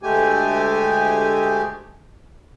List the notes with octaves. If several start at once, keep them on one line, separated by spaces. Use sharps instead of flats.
D2 G#3 A3 G4 G#5